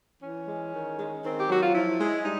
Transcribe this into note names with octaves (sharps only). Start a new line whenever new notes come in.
E3 C#4
G#3
D#3
G#3
D#3 C4
G4
F#3 F#4
F4
F3 E4
G#3
G3 D#4